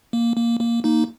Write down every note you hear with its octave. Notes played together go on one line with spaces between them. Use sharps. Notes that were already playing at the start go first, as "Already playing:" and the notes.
A#3
A#3
A#3
A#3 D#4